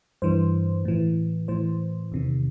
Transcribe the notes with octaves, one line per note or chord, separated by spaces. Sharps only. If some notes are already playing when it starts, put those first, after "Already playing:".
G2 E3 C5
A2 E3
A2 E3 C5
E2 C3 D#3